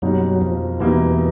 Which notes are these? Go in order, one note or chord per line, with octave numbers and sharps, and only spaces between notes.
F#2 B2 F#3 G3 A#3 D#4
F2 F3
E2 B2 E3 G3 A#3 D#4